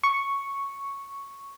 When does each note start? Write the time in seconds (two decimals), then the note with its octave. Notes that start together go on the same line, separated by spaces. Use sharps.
0.04 C#6